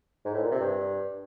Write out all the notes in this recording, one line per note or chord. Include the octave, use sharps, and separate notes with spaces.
G#2
A2
A#2
C3
G2